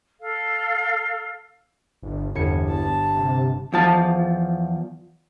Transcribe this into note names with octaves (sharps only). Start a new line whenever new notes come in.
A4 F5
G1
G1 E2 G#6 C#7
A5
C3
E2 F3 A5